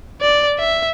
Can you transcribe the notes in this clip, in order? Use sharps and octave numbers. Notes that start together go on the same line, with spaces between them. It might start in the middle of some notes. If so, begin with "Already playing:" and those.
D5
E5